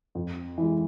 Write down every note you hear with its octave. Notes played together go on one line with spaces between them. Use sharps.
F2
E3 G#3